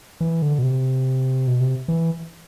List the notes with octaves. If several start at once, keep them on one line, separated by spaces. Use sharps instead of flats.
E3
D3
B2
C3
B2
C3
E3